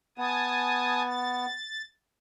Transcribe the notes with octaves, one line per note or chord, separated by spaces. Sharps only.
B3 G#5 A5 D#6
A6